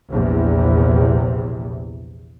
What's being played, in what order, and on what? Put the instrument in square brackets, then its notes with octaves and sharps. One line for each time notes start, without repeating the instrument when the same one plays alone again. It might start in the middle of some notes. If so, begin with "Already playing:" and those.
[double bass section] A#1 E2 C3